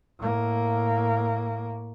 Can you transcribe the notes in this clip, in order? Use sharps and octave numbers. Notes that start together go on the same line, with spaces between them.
A2 A#3